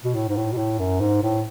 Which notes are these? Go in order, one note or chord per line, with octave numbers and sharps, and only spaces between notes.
B2
A2
G#2
A2
B2
A2
F#2
G#2
A2